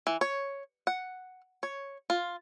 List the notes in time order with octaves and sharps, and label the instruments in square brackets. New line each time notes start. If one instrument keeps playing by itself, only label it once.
[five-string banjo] E3
C#5
F#5
C#5
F4